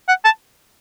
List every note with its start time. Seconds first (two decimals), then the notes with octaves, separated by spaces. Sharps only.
0.08 F#5
0.25 A5